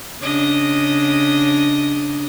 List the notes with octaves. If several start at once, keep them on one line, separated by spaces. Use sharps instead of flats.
C#3 D4 D#5